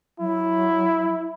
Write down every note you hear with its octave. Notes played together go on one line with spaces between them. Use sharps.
F#3 E4